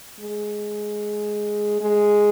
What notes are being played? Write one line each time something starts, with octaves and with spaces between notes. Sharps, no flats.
G#3
G#3